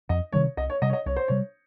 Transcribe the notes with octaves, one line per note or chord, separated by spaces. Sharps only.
F2 D#5
C3 D#3 G3 C#5
C2 D#5
C#5
C3 G3 D#5
C#5
D#5
C2 C#5
C5
C3 G3 C#5